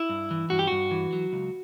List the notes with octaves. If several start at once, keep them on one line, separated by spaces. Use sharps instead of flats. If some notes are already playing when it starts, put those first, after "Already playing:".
Already playing: E4
G2
E3
G2 F#4
G4
G2 F#4
E3
F#3
C#2